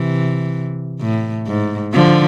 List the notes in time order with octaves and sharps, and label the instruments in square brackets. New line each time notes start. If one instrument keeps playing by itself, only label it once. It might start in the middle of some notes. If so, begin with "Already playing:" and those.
Already playing: [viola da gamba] C3 E3
A2
G#2
D3 F3